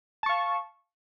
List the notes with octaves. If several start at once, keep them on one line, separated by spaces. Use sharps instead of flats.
F5 A5 C#6